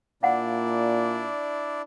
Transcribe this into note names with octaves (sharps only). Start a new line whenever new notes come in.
A#2 D4 E4 D5 F5 F#5